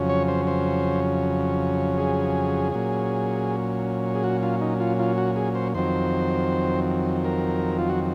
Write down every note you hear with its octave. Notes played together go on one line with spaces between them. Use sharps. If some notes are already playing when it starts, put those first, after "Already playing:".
Already playing: F2 C#3 F#3 C#4
C#5
C5
C5
G#4
A#2 F#3 C#4
G#4
F#4
F4
D#4
F4
F4
F#4
G#4
C5
F2 D#3 F#3 C4 C5
A#4
F4
F#4